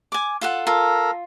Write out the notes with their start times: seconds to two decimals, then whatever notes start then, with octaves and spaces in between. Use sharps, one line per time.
0.12 G#5 D6
0.41 F4 A4 F#5
0.67 F4 A4 A#4